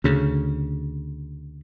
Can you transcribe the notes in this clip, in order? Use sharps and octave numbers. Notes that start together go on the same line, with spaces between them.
D2 C#3